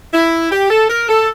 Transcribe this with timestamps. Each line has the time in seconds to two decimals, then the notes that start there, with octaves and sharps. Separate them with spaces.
0.13 E4
0.50 G4
0.69 A4
0.89 A#4
1.08 A4